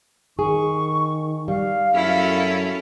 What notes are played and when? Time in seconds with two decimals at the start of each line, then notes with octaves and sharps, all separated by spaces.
0.39 D#3 G#4 C#6
1.48 G3 F5
1.94 F#2 C#4 E4 A4